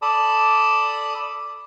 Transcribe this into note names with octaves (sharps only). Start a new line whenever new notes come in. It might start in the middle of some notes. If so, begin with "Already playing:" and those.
A4 D5 A5 B5 D#6